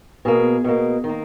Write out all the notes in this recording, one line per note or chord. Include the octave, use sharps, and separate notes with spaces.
B2 A#3 G#4
B2 A#3
D#3
A#3